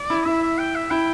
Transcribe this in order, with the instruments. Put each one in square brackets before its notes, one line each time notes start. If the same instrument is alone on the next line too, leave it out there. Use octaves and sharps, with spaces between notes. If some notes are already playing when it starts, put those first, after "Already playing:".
Already playing: [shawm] D5
[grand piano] E4
[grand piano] E4 [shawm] E5
[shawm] E5
G5
E5
[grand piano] E4 [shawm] G5